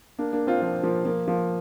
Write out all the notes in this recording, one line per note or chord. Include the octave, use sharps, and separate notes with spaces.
A#3 D4
A#3 D4
C4 F4
F3 A#3
F3 A#3
F3 A#3
F3 A#3